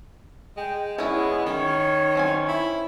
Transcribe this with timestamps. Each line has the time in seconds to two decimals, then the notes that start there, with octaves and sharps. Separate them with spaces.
0.57 G#3 G5
0.98 G#3 B3 C#4 E4
1.46 D#3 C#4 C#5
2.15 C4 C#4 G#5
2.48 E4